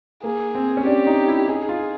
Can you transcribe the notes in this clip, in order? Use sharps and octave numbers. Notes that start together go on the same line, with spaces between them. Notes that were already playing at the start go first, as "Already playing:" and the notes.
A#3 G#4
C4
C#4
D4 G4
D#4
E4
D#4 G#4
F4